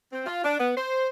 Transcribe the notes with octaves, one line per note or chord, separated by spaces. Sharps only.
C4
F4
D4
B3
C5